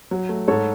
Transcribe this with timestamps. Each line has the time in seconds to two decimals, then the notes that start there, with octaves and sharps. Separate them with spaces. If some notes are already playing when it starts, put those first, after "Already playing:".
0.11 F#3
0.29 A3
0.48 G#2 A4 C#5